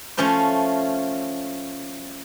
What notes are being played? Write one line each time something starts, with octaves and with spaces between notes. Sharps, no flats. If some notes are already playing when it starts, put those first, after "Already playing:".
F3 A3 C#4 F4 C5